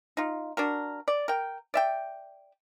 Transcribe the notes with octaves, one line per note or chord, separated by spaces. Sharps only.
D#4 F4
D4 F#4 A#4
D5
A#4 G5
D5 E5 G5